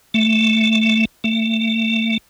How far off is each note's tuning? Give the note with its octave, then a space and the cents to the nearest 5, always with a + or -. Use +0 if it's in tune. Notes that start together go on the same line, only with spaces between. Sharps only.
A3 +5
A3 +30